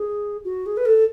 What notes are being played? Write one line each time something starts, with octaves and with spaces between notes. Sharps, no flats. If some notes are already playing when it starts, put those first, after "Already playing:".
Already playing: G#4
F#4
G#4
B4
A4